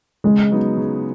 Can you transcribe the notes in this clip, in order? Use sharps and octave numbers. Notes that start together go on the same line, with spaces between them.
C#3 G#3
F#3 B3 D#4
C#3